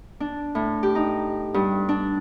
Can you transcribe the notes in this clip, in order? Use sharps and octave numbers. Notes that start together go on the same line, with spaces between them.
D4
A2
G4
D#4
G2
D4